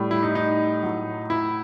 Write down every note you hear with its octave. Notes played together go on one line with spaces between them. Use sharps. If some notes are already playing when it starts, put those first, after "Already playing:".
Already playing: A2 G3
E4
D#4
D#4
A2 F#3
E4